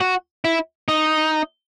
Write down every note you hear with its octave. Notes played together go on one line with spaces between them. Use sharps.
F#4
E4
D#4